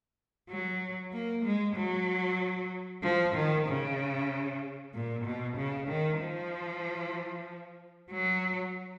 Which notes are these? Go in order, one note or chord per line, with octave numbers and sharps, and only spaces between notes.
F#3
A#3
G#3
F#3
F3
D#3
C#3
A#2
B2
C#3
D#3
F3
F#3